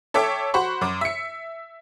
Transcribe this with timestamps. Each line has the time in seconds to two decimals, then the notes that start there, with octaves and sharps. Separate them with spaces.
0.14 A4 C#5 E5 G5 D6 E6
0.54 F#4 C5 F#5 B5 C#6
0.81 F#2 D6
1.01 E5 C#7